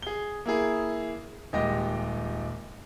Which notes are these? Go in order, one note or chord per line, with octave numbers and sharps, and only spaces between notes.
G#4 G7
A#3 E4 G#4
D#1 G#3 G4 D#5 G5 A#6